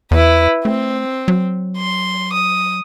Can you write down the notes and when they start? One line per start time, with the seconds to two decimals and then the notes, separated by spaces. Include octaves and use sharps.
0.11 E2 E4 B4
0.65 A3 C4
1.28 F#3
1.77 C6
2.33 D#6